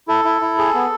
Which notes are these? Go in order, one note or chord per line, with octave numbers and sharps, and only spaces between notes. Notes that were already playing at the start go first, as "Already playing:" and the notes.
E4 A4
E4
E4
G#4
B3